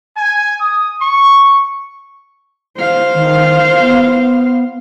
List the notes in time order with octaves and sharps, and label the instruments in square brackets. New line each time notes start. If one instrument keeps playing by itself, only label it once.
[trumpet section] G#5
D#6
C#6
[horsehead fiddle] C5 F5
[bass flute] D#3
B3